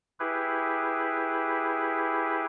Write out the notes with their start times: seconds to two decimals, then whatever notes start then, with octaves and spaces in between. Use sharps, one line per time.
0.20 E4 G4 G#4 B4